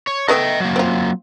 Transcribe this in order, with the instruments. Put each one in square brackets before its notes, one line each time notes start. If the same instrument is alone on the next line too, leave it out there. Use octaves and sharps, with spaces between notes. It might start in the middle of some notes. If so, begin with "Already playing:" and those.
[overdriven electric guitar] C#5
[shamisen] A3 B3 E5 [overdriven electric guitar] D#5 G5
[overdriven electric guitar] F#3 A#3
[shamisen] C4 F4